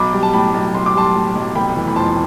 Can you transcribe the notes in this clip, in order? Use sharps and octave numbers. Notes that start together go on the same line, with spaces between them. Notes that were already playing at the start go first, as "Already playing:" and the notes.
Already playing: B1 B5 D6
G3
A5
A2 G5 B5
B1
B1 C6
D6
G3 A5 C6
A2
B1
F1 G5 B5
E3
B5
F2 A5 C6